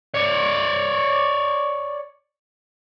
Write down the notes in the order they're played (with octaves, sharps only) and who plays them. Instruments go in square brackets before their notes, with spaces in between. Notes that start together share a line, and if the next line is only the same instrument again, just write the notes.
[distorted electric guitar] C#5 D5